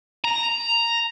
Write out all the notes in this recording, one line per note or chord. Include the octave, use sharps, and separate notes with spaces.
A#5